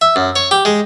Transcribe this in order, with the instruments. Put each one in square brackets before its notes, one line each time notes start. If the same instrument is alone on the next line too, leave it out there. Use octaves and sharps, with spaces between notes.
[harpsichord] E5
F#2
C#5
G4
G#3